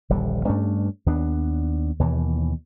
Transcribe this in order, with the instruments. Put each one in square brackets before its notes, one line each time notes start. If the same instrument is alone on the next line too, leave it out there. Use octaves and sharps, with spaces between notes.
[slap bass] D#1 A#1 D3 G3
G2 A3 C#4 D4
D#2 B3 D4
D#2 B2 E3